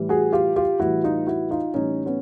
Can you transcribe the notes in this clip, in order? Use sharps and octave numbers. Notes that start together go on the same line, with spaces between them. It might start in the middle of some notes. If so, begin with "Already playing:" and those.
Already playing: A2 E3 G3
F#4 G#4
F4 G4
F4 G4
A2 E3 G3 E4 F#4
D#4 F4
E4 F#4
D#4 F4
A2 E3 G3 C#4 D#4
B3 C#4